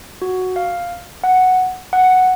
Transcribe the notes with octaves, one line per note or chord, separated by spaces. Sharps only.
F#4
F5
F#5
F#5